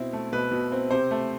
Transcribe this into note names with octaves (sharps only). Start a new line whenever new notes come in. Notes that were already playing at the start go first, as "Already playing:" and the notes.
Already playing: B2 C4 E4
A3
B2 B4
B2
C4
C3 C5
A3